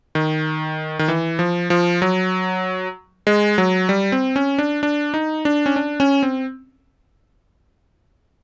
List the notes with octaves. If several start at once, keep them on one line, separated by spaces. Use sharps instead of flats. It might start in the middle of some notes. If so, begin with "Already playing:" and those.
D#3
D#3
E3
F3
F3
F#3
G#3
F#3
G3
C4
C#4
D4
D4
D#4
D4
C#4
D4
C#4
C4